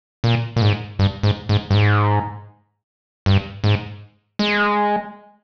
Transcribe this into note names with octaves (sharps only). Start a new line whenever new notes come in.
A#2
A#2
G#2
G2
G#2
G#2
G2
G#2
G2
G#2
G#3